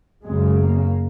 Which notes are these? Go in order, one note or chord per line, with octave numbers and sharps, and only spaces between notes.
F#2 C#3 G#3
A#3